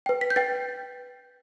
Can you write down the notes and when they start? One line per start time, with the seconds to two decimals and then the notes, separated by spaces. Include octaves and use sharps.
0.06 B4 G5
0.21 B6
0.30 G6
0.36 B4 G5 A6